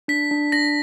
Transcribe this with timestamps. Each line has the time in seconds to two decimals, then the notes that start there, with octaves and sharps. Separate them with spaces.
0.08 D4 B6
0.31 D4
0.52 D4 A#6